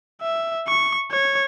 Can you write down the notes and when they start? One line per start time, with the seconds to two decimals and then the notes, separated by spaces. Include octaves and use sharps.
0.22 E5
0.68 C#6
1.12 C#5